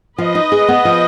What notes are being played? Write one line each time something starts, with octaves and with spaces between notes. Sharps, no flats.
F3 B4 D#5
D#4
G#4
B3
F3